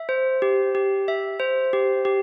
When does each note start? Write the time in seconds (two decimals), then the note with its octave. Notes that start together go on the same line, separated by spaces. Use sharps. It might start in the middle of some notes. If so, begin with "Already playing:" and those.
Already playing: E5
0.09 C5
0.42 G4
0.75 G4
1.08 E5
1.40 C5
1.73 G4
2.05 G4